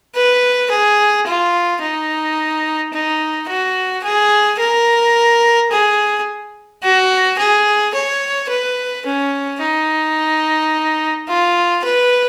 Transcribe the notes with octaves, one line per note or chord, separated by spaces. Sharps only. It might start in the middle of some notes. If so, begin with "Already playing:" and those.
B4
G#4
F4
D#4
D#4
F#4
G#4
A#4
G#4
F#4
G#4
C#5
B4
C#4
D#4
F4
B4